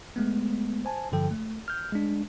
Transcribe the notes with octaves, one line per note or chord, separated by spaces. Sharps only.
G#3 A3 B3
C5 G#5 A5
G2 D3 F3 A4 G5
A3
F6 G6
G#3 D4